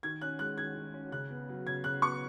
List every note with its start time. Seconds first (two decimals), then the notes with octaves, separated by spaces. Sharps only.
0.03 D#3 G#6
0.21 C#4 F#6
0.39 G#3 F#6
0.58 D#3 G#6
0.76 D#3
0.94 C#4
1.12 C#3 F#6
1.30 B3
1.48 F#3
1.66 C#3 G#6
1.84 C#3 F#6
2.02 B3 C#6